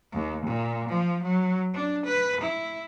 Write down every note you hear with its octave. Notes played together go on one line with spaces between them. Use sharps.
D#2
A#2
F3
F#3
D4
B4
E4